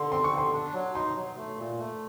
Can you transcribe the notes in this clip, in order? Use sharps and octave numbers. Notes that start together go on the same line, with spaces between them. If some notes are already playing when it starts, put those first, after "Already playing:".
Already playing: D3 C6
C4 C6
C#6
D3
C6
D4
F#3
D#4 C6
F#3
A3
A#2
A3